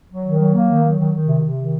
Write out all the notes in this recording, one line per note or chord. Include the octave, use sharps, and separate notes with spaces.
F#3
D#3
F#3
A#3
D#3
F#3
D#3
D#3
C3
C3
D#3